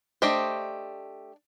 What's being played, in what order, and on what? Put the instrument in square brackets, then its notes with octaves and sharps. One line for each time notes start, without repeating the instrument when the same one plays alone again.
[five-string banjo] A3 D4 G4 C5 D#5